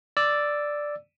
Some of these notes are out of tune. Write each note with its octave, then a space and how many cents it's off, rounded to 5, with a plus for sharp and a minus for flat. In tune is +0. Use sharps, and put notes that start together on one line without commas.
D5 +0 E6 +0